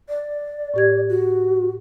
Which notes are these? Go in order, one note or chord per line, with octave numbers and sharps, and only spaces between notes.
D5
A2 G4 G#6
F#4